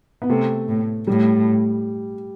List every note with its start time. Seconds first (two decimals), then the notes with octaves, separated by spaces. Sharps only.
0.22 B3
0.29 C3 A3
0.69 A2
1.07 A2 G3